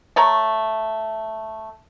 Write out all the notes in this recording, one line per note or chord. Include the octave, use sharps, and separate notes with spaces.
A3 C#5 A#5